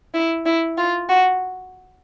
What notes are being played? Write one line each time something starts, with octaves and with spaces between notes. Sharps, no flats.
E4
E4
F4
F#4